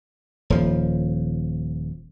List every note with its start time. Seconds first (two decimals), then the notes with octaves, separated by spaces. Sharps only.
0.50 D#1 F3